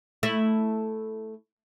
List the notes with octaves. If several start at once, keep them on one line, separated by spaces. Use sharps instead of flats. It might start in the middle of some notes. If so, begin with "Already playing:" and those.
A3 E4